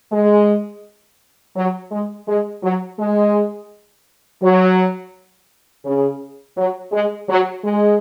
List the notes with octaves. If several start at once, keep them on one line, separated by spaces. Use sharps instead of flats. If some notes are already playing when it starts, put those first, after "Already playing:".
G#3
F#3
G#3
G#3
F#3
G#3
F#3
C#3
F#3
G#3
F#3
G#3